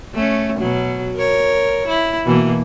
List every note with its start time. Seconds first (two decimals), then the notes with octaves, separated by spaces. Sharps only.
0.14 A3 C#4
0.59 B2 F#3
1.16 A#4 C#5
1.87 E4
2.25 B2 E3 A#3